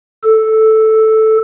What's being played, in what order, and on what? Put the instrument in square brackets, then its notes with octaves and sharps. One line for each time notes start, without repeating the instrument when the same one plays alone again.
[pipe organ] A4